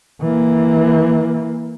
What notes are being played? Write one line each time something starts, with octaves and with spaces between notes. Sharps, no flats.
E3 A#3